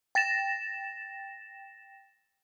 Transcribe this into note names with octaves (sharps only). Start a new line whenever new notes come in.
G5 A6 A#6 E7